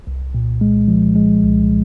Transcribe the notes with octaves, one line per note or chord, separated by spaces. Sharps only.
C2
A#2
G#3
F3
G#3
C2